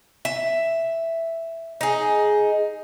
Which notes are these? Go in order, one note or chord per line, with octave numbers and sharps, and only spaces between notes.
E5
D#4 G#4